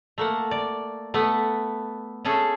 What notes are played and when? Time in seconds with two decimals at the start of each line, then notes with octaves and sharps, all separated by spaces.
0.18 A3 A#3 F#5
0.51 D5
1.14 A3 B3 F#5
2.25 A3 C#4 G#4 A4